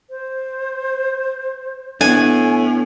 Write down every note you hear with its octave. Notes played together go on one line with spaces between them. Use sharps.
C5
A2 B3 D4 G#5